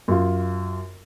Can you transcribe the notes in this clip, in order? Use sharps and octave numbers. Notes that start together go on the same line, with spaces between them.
F#2 F4